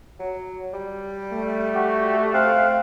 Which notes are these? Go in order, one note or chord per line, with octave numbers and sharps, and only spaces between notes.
F#3
G3
A3
F#4 G4
C4 F5 F#5